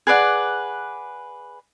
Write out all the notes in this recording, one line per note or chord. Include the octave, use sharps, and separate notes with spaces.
G#4 B4 D5 F#5